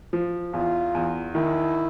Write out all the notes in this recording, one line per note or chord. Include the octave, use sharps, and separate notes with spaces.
F3
E2 F4
E2
D#3 E4